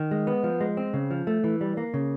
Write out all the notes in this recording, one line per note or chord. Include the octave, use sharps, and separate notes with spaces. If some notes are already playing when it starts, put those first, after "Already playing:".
Already playing: D#3
G#3
B3
F3
G#3
C4
C#3
F3
A3
E3
G3
A#3
C#3